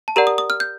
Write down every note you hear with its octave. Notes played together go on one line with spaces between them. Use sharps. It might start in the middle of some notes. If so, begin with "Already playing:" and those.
A5
G4 A#4 D5 F#5 A#5
D#6
D#6
F6
G6